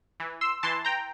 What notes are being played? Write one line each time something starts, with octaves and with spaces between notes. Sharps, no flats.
E3
C6 E6
E3 A5 C6
G5 A#5